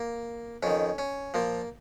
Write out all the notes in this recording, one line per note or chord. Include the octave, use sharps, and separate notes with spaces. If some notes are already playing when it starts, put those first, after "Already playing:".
Already playing: A#3
F2 D#3 C#4
C#4
A#2 F3 A#3